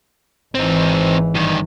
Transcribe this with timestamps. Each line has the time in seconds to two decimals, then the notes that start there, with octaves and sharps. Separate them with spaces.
0.55 G#1 E3 C4 D#4
1.35 G2 D#3